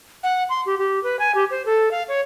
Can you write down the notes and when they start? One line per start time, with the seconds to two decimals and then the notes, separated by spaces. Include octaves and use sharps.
0.23 F#5
0.49 C6
0.66 G4
0.78 G4
1.03 B4
1.19 G#5
1.35 G4
1.51 C5
1.66 A4
1.91 F5
2.08 C#5